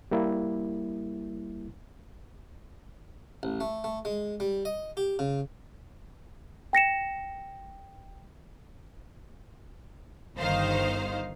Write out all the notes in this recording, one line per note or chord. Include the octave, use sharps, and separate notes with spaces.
G3 A#3 E4
A1
A3
A3
G#3
G3
D#5
G4
C#3
G5 A#6 C#7 E7
G1 D#3 D#4 C5 F5